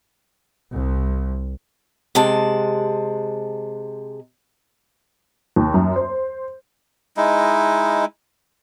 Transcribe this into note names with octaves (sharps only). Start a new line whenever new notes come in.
C2
C3 G#3 A5
D#2
F#2
C5
G#3 D#4 E4